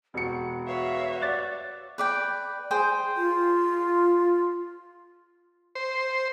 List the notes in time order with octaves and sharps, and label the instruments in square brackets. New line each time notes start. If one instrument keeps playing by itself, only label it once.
[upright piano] E1 C#7 [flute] F#4
[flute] F#4 [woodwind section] B4 F5 [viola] C#5 E5
[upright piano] D5 F#6 A6
[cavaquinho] B4 D5 G5
G#4 C5 G5
[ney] F4
[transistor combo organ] C5